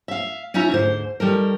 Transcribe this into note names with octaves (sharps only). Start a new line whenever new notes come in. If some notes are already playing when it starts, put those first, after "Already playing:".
E5 F5
C#4 D#4 F4 E5 A#5
D2 G#2 C5
D#3 G3 A4 A#4